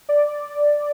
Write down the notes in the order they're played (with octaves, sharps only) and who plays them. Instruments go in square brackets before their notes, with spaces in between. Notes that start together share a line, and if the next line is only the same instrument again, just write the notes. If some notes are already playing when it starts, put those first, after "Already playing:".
[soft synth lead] D5